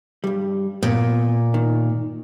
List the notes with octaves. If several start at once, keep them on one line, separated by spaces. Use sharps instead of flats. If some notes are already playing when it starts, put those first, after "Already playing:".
G2 G3
A#2 B3
D#3